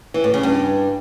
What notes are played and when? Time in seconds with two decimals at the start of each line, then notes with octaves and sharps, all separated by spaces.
0.14 E3
0.24 A2
0.34 C#3
0.43 G2